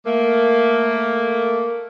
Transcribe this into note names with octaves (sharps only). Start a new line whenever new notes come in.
A3 A#3